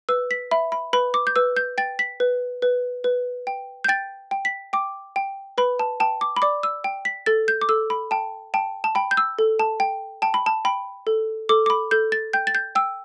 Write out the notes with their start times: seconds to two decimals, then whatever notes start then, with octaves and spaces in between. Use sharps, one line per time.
0.09 B4 E6
0.31 B6
0.51 E5 B5
0.72 B5
0.93 B4 B5
1.14 D6
1.27 G6
1.36 B4 E6
1.57 G6
1.78 G5 A6
1.99 B6
2.20 B4
2.62 B4
3.04 B4
3.47 G5
3.84 G6
3.88 G5 A6
4.31 G5
4.45 B6
4.73 G5 D6
5.16 G5
5.58 B4 B5
5.79 A5
6.00 G5 A5
6.21 D6
6.36 B5
6.42 D5 D6
6.63 E6
6.84 G5
7.05 B6
7.26 A4 A6
7.48 G6
7.61 D6
7.69 A4 E6
7.90 B5
8.11 G5 A5
8.54 G5 A5
8.84 A5
8.95 G5 B5
9.11 G6
9.17 E6
9.39 A4
9.59 A5
9.80 G5
10.22 G5 A5
10.34 B5
10.46 A5
10.65 G5 B5
11.07 A4
11.49 A4 D6
11.66 D6
11.70 B5
11.91 A4 G6
12.12 A6
12.33 G5 G6
12.47 A6
12.55 G6
12.75 G5 E6